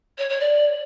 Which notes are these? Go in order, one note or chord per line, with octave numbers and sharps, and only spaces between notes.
C#5
C#5
D5